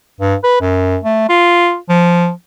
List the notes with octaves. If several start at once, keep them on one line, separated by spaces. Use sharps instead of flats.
G2
B4
F#2
A3
F4
F3